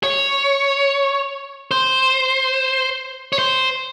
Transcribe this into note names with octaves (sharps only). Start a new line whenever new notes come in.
C#5
C5
C#5
C5